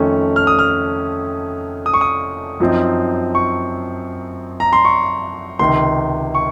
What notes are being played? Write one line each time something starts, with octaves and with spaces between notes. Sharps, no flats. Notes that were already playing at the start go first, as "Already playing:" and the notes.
Already playing: F2 D#3 A3 C#4
F6
D#6
F6
D#6
C#6
D#6
F#2 F3 C4 D#4
C#6
A#5
C6
C#6
C#2 C3 D#3 C6
C#6